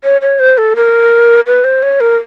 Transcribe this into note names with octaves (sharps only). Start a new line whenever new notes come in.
C#5
C#5
C5
A4
A#4
B4
C5
C#5
A#4